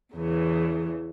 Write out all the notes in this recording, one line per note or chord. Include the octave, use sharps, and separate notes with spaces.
E2 C#3 E3